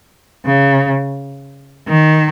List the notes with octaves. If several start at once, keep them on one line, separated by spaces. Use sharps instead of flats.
C#3
D#3